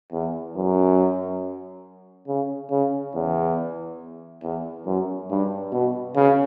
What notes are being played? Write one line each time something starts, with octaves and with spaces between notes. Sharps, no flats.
E2
F#2
C#3
C#3
E2
E2
F#2
G2
B2
C#3